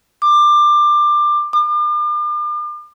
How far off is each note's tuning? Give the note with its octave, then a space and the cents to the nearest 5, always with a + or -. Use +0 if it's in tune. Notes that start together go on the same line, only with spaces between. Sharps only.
D6 +20
D6 +40